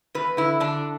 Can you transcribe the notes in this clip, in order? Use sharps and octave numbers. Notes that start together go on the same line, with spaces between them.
E2 B4
D3 E4
D3 D4